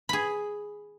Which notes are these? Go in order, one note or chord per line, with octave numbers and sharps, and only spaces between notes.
G#4 B5